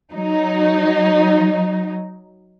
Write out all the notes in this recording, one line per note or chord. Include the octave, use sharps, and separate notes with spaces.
F#3 D#4